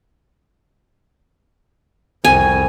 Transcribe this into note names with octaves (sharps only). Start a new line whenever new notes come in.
C2 F2 G#5